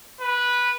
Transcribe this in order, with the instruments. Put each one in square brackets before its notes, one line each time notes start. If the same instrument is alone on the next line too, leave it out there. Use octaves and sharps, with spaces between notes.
[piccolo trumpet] B4